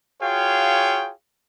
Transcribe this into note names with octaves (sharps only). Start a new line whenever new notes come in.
F4 F#4 G#4 C#5 F5 G5